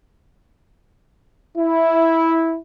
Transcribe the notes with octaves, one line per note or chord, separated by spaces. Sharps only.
E4